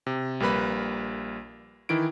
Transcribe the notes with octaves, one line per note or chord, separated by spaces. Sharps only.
C3
A#1 G3 A#3 B4 B5
D#3 E3 E4 D7